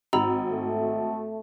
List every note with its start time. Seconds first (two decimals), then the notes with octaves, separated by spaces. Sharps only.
0.13 G#1 D#4 A#5 B5 E6
0.49 A3